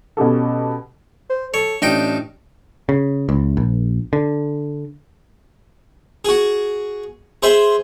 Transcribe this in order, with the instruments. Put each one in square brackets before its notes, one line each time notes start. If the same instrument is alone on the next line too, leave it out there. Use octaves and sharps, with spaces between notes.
[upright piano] B2 C#4 G4 A4
[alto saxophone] C5
[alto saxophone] A4 [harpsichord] C#5
[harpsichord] A1 D#4 G5 [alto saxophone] D4
[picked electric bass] C#3
C#2
A#1
D3
[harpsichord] F#4 G#4
G#4 C5 E5